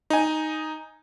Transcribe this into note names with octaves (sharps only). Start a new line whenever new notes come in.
D#4 G#5